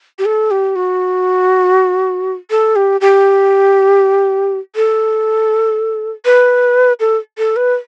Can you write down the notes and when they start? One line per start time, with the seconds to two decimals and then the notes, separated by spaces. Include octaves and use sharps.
0.19 G4
0.25 A4
0.51 G4
0.76 F#4
2.50 A4
2.76 G4
3.01 G4
4.76 A4
6.25 B4
7.00 A4
7.38 A4
7.56 B4